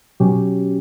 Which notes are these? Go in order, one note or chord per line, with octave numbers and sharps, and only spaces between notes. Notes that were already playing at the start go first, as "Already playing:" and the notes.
B2 F#3 C#4 G4